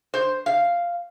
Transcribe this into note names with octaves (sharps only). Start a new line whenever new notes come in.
C5
F5